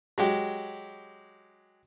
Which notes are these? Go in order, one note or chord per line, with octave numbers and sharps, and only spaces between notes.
F#3 G#3 G4